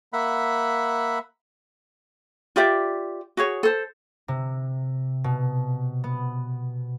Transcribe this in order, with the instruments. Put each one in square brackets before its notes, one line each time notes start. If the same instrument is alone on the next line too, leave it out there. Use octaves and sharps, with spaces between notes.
[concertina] A#3 E5 F#5 B5
[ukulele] F4 G4 D5 E5
F#4 G#4 C#5
A4 C5
[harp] C3
B2
B3